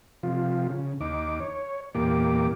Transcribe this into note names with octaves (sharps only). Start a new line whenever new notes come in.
C3 F3 F4
C#3
D#2 D#4 D6
C#5
E2 A#2 A#3 G4 D6